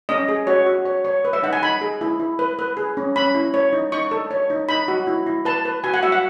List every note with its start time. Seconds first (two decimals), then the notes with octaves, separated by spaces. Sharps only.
0.09 C#4 D#5
0.29 G#4
0.47 F#4 C#5
0.66 F#4
0.85 C#5
1.05 C#5
1.25 B4
1.33 E5
1.43 D#4 F#5
1.53 G#5
1.62 D#4 B5
1.81 G#4
2.01 E4
2.20 E4
2.39 B4
2.59 B4
2.77 G#4
2.97 C#4
3.16 C#4 B5
3.35 E4
3.54 C#5
3.73 D#4
3.92 D#4 C#6
4.11 A4
4.31 C#5
4.50 D#4
4.69 D#4 B5
4.88 F#4
5.07 E4
5.27 E4
5.45 B4 A5
5.65 B4
5.84 F#4 G#5
5.94 F#5
6.03 F#4 E5
6.12 F#5